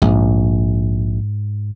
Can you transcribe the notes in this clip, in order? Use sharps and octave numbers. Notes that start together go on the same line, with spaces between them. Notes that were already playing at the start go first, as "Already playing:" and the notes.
A#1 G#2